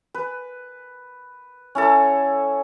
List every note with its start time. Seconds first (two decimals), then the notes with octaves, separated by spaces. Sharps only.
0.14 B4
1.75 C#4 E4 A4